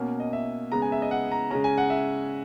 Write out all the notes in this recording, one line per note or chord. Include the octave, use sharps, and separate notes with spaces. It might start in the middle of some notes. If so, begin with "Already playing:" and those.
Already playing: B2 A#3 C#4
D#5
E5
C#3 G#3 B3 A#5
G#5
E5
D#5
F#5
A#5
C#3 G#3 C#4 A#5
G#5
F#5
E5